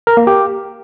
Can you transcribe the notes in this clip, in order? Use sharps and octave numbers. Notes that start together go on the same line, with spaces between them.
A#4
A#3
G4